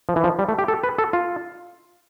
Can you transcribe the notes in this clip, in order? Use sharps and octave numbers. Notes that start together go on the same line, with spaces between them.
F3
E3
F3
G3
A3
G4
A4
B4
A4
F4